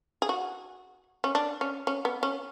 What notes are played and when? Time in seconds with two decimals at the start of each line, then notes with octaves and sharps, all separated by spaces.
0.22 G#4
0.29 F#4
1.24 C#4
1.35 D4
1.61 C#4
1.87 C#4
2.05 B3
2.23 C#4